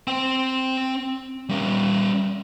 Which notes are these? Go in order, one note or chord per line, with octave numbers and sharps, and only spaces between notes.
C4 G5
G3 C#4